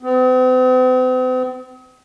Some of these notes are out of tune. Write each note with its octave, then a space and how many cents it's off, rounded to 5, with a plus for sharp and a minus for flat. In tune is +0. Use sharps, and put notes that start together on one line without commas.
C4 -45